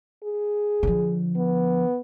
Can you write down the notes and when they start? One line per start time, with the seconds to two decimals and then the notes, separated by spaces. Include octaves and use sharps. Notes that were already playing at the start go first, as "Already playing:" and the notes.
0.24 G#4
0.83 D3 F3
1.36 B3